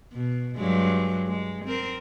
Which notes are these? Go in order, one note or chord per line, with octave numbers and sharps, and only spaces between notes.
B2
G2 F#3 G#3
G#3
C4 A#4